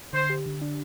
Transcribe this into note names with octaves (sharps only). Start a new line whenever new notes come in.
D3 C5
G4
D3
D4